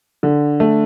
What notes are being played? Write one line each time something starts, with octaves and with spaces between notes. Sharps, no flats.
D3
A3